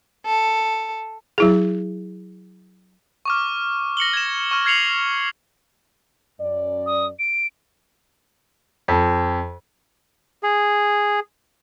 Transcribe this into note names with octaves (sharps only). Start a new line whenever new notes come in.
A4
F#3 E4 G#4
C#6 D6 F6
A#6 C#7 F#7 G7
G#6 E7
C#6 F6
F6 G#6 C7 C#7 F7 F#7
F#2 D5
D#6
D7
F2
G#4